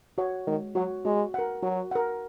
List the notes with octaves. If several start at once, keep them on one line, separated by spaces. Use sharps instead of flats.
F#4 C#5 F#5
D#3 G#3
F#3 F#4 C#5 F#5
G#3 F#4
A#4 F#5
F#3 F#4
A#4 F#5